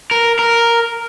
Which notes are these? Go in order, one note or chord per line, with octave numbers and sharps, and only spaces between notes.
A#4
A#4